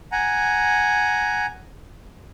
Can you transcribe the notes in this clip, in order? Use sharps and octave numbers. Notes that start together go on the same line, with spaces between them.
F#5 G#5 A#5